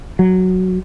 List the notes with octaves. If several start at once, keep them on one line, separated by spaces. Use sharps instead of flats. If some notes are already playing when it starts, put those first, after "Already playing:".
F#3